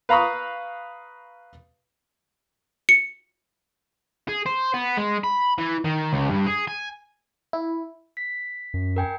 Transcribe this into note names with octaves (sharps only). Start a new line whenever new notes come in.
B4 F5 A#5 B5 C#6 D#6
C#7
G#4
C5
B3
G#3
B5
E3
D#3
C#2
G2
G#4
G#5
E4
B6
F#2
A#4 G5 G#5